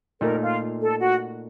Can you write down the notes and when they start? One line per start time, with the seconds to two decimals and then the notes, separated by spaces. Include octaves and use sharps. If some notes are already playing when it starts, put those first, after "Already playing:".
0.21 A#2 A3 D#4 A#4
0.41 F4
0.80 A4
1.00 F#4